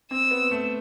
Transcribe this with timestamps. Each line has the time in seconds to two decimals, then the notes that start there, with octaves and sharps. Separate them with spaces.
0.11 C4 E6
0.31 B3
0.51 A3